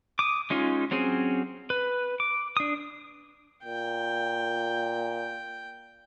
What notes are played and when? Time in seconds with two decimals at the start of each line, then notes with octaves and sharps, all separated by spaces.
0.19 D6 D#6
0.50 G#3 C#4 D#4 F4
0.91 F#3 C4 C#4 G#4
1.70 B4
2.20 D6
2.57 D4 D#6
3.64 A#2 G5